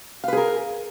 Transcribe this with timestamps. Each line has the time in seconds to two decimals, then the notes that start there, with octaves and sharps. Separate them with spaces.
0.24 F5
0.28 B4
0.33 G#4
0.37 A#4